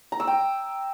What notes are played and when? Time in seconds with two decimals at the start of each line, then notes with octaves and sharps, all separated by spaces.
0.12 A#5
0.20 E6
0.27 G5